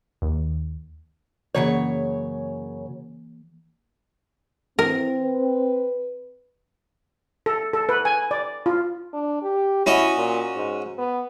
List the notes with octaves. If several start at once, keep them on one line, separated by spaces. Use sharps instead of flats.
D#2
F#2 C#3 E3 A#3 G#4 C#5
E3 C4 A#4
B4
A4
A4
B4
G#5
D5
F4
D4
G4
C#4 E4 F#4 D#5
A#2
G#2
B3